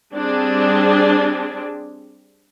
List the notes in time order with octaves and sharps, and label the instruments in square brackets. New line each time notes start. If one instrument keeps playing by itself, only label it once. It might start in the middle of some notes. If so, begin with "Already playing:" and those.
[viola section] G3 C4 D4 G#4